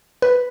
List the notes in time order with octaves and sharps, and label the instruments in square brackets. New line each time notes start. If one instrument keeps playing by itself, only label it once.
[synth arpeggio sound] B4